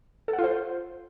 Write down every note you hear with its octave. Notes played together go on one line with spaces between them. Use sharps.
A4
F#5
F4
C5